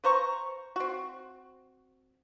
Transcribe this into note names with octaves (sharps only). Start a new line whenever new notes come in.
B4 C5 A#5 C#6
C4 F#4